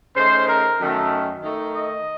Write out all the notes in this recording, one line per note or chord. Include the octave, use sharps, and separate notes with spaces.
C#3 A3 D#4 C5
A#4
F#2 D#3 A3
D#3 A3 D#4
D#5